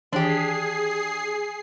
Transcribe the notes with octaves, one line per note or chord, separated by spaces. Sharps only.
D#3 E3 D4 G4 G#4 C7